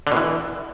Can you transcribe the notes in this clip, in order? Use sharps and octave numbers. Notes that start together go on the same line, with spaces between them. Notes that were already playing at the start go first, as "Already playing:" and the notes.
D3
B2
E3